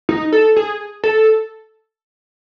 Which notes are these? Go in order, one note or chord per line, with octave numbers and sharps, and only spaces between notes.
D#4
A4
G#4
A4